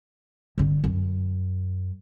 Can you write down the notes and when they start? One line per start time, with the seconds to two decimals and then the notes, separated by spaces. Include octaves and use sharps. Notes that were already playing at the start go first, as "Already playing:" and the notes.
0.58 G1 D3
0.84 F#2